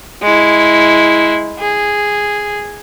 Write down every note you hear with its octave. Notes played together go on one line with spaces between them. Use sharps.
G#3 E4
G#4